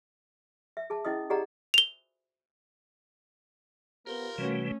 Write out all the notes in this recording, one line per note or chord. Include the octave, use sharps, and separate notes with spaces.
E5
G#4 A5
C#4 E4 D#5 D#6
G4 G#4 D5 D#5 F#5 A#5
F7 G7
B3 F4 G4 A#4 C5
C3 E3 G3 A3 C#4 F#4 B4